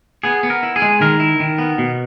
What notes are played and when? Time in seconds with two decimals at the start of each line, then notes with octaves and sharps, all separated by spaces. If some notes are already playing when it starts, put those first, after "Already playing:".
0.24 B3 G#4
0.43 B3
0.50 A#4
0.63 E4
0.76 G#4
0.82 G#3
1.01 D#3 A#4
1.20 E4
1.40 D#3
1.58 B3
1.78 B2